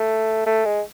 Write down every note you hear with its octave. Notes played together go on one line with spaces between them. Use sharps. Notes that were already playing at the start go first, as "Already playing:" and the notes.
Already playing: A3
A3
G#3